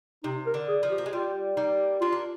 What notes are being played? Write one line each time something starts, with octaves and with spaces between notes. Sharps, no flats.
C3 D#4
A#4
D3
G#4
F3
G4
A#3
G#3
G3 F4
G3 A#3 D#4
A#3 D4 F4
A#3